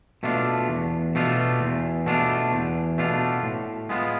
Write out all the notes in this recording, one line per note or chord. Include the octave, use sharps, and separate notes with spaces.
B2 A3 D4 F4
E2
B2 A3 D4 F4
E2
B2 A3 D4 F4
E2
B2 A3 D4 F4
A2
G#3 B3 F4